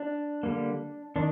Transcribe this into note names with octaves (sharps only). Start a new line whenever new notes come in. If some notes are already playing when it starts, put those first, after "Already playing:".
Already playing: D4
D3 G3 A#3
D#3 D4